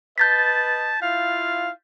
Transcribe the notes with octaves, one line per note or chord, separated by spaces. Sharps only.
B4 D#5 A5 G6 A6 B6
E4 F4 F5